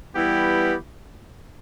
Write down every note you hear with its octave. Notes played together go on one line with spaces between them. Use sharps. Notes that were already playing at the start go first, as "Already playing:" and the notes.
E3 G3 B3 E4 G4